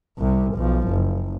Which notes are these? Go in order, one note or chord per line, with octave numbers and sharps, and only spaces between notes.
C2 C3
B1 F3
F#1